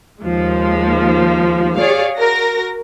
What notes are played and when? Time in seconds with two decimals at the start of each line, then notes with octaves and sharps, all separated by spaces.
0.21 D#2 F3 G#3
1.77 G4 G#4 C#5 D5 F5
2.16 F#4 A#4 A#6